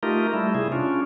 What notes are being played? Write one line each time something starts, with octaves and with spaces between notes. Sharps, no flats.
A3 D#4 F4 G4 A#4
G3 A3 E4
C3 E4 G#4
C#4 D4 F4